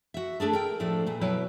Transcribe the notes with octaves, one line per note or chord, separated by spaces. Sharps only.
F#4 E5
A3 D4 G#4 A4
A#4 G5
A2 F3 A3 D4
A#2 B3
B2 F#3 E4 B4 E5 G5